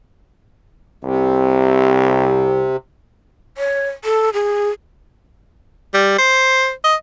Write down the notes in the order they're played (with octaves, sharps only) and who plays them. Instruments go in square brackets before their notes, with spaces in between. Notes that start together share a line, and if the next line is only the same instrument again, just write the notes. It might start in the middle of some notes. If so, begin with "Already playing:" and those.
[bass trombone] C2 [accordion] C3
[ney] C#5
A4
G#4
[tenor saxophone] G3
C5
D#5